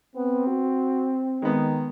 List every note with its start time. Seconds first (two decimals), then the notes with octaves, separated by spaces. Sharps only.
0.15 B3 C4
0.47 F#4
1.42 D#3 G#3 B3